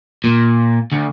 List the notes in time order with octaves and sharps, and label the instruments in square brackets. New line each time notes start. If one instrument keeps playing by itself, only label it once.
[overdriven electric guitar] A#2
D2